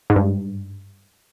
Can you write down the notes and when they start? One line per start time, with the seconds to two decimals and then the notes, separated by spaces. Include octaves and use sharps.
0.10 G#2
0.16 G2